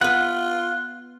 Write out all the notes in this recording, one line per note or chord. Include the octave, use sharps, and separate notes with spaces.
B3 F4 B4 F#5